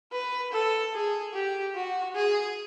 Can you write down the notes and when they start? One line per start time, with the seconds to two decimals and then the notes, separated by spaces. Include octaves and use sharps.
0.12 B4
0.52 A4
0.94 G#4
1.34 G4
1.75 F#4
2.15 G#4